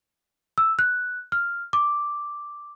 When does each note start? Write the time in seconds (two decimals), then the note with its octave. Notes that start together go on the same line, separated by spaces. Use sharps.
0.58 E6
0.79 F#6
1.32 F6
1.73 D6